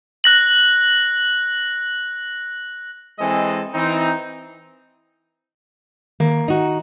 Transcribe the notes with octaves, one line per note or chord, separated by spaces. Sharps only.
F#6 A#6 F#7
E3 G#3 C4 G#4 A4 D#5
E3 C4 D#4
D#3 A#3
D#4 F#4